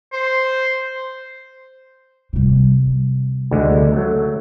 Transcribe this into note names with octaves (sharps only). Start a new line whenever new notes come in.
C5
C3 G3
D2 D3 G#3
F#3 A3